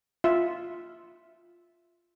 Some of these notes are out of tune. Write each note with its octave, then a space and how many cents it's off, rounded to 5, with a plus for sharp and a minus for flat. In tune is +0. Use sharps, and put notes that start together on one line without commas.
F4 +0 E5 +0